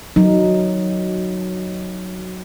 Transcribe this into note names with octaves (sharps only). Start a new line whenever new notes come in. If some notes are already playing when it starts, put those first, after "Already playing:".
F#3 D#4